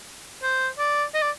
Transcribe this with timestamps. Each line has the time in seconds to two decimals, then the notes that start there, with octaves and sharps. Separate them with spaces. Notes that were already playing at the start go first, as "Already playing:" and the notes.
0.43 C5
0.79 D5
1.14 D#5
1.22 D5